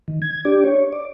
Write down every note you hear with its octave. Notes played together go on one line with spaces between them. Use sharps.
D#3
G#6
D4 G4 D5
C#5
D5